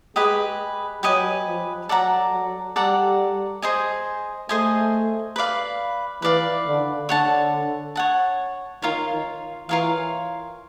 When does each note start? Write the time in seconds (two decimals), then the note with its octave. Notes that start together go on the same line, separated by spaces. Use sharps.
0.16 G#3 G4 B4 D#5 G#5
1.03 F#3 G4 B4 D#5 G#5
1.46 F3
1.89 F#3 A4 D5 F#5 A#5
2.33 F#3
2.76 G3 A4 D5 F#5 A#5
3.62 G#4 C5 D#5 G#5
4.49 A3 G#4 C5 D#5 G#5
5.36 B4 D5 F5
6.22 E3 B4 D5 F5
6.66 D3
7.09 D3 C#5 F#5 A5
7.96 C#5 F#5 A5
8.82 D#3 F4 A#4 C#5 F5
9.11 D#3
9.69 E3 F4 A#4 C#5 F5